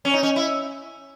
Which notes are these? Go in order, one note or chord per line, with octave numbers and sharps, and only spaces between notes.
C#4
D#4
C#4
E4